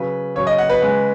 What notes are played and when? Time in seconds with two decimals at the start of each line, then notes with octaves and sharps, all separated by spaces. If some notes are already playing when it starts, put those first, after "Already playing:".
Already playing: C#3 F#3 B4
0.35 C#3 F#3 C#5
0.47 D#5
0.58 F#5
0.70 B4
0.81 C#3 G#3